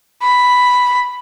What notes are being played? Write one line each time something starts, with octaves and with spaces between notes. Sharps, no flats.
B5